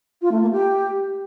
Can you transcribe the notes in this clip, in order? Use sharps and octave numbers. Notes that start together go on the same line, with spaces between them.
F4
A3
A#3
G4